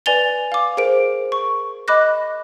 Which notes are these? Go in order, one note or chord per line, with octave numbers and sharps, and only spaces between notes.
B4 D5 G#5 A6 F7 G7
F5 D6
G#4 A#4 C5 D7
C#6
D#5 B5 D6 F#6 A#6